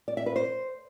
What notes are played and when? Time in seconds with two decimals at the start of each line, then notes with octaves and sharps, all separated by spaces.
0.08 D5
0.17 E5
0.26 B4
0.36 C5